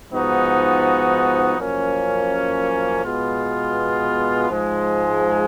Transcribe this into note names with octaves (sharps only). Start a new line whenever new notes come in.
G#2 F3 B3 D#4 F#4
F#2 F3 A#3 C#4
B2 G#3 B3 F4
G#2 F3 G#3